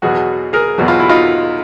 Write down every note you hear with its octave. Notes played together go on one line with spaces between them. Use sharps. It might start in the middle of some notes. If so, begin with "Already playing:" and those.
E2 B2 F#3 F#4 G#4
G#4 A#4
E2 B2 F#3 F#4
F4
E4
D#4 F4